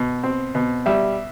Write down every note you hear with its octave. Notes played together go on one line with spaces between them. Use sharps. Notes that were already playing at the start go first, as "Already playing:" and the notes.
Already playing: B2
C4
B2
G3 E5